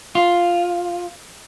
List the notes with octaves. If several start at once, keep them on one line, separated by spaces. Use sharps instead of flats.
F4